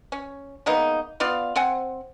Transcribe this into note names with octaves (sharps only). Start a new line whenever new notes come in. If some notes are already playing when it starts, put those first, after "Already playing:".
C#4
G#3 A#3 B3 D#4
B3 F4 D5 F5
C4 C5 F#5 G#5